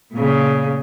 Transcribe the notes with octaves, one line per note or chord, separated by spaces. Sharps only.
A#2 C#3